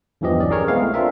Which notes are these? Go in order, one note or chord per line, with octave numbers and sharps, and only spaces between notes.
E2 G2 E3 F3 G4 D#5
B1 C#4 D5
G#4 A#4 C#5
G#3 B3 C4 E4 G#4 F5
A3
C4 D4 F4 A#4 E5